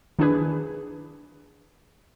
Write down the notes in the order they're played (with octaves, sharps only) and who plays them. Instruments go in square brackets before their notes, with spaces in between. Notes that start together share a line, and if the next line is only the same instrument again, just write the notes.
[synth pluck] D#3 D4 E4 G#4 B4